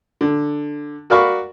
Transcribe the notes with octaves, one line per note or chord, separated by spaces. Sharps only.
D3
F#4 A#4 D5 F5 B5 C#6